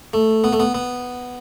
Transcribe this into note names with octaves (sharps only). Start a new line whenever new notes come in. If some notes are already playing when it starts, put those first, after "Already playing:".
A3
B3
A3
B3
B3